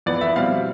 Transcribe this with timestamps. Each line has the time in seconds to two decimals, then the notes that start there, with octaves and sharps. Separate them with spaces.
0.06 F2 E3 B3 D5
0.21 E5
0.35 B2 G3 C4 E4 F5